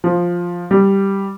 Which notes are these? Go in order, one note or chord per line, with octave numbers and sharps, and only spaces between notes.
F3
G3